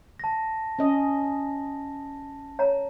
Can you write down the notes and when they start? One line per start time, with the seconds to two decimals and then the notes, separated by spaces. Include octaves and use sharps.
0.20 A5 A#6
0.79 C#4 D#5
2.59 C#5 A#5